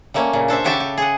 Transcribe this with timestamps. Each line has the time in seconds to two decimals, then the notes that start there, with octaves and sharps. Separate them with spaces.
0.14 G3 A3 A#3 C#4
0.33 A#2 C#3
0.48 D4 A4 C5 E5
0.64 C#3 F#4 G4 A4 E5 A5
0.80 G4
0.98 G#4 F#5